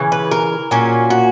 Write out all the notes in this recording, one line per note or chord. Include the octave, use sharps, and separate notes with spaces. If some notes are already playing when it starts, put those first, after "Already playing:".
Already playing: C#3 E3
B4
A#4
A#2 F#3 A#3 C#4
F#4